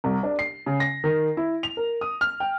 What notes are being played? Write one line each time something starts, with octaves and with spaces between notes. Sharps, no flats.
C2
D4
C7
C#3
A#6
D#3
E4
F7
A#4
D#6
F6
G5